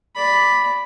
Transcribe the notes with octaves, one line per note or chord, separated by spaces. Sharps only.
D5 B5